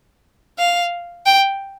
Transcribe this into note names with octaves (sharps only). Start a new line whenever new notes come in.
F5
G5